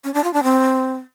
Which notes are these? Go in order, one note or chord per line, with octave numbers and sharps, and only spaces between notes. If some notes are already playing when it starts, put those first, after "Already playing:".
C#4
D4
F4
D4
C4